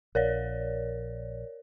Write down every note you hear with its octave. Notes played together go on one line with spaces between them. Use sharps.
A#1 A#4 C#5 D5